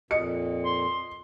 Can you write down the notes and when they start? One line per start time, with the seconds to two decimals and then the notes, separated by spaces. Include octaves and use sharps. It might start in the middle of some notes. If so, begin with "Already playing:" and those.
0.11 F2 A#2 D#5 C#7
0.65 C6